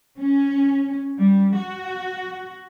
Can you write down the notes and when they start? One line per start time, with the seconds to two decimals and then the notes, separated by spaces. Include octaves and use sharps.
0.17 C#4
1.17 G3
1.56 F#4